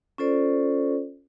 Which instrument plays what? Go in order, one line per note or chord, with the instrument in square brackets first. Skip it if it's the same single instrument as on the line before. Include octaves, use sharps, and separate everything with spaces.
[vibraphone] C#4 F4 A4 C5 D5